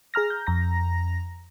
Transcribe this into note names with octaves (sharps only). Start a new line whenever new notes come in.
G#4 A#5 F6 A#6
G6
F2 A#5 A#6